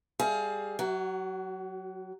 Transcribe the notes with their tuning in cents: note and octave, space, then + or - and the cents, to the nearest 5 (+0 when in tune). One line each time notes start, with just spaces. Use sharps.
G3 +20 G#4 +25 F5 +0
F#3 +0 F#4 +40